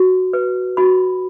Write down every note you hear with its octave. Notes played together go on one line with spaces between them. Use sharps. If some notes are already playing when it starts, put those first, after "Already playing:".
Already playing: F#4
B4
F#4 B5